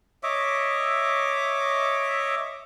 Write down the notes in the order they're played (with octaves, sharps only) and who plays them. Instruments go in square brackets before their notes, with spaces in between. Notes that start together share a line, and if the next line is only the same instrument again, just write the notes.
[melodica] C#5 D#5 E5 D6